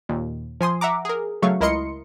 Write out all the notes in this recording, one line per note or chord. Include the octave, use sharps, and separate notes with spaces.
D#2 A#2
F3 G#5 C6 D#6
E5 F#5 A#5 D6
G#4 A#4
C#3 F#3 A3 F5 C#6
C#2 E4 A#4 D#5 C6 C#7